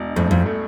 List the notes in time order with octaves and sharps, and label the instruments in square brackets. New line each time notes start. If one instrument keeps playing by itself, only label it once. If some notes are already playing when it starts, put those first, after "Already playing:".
Already playing: [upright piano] E1
[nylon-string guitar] F2 [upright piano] A2
[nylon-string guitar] F2
[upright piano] A3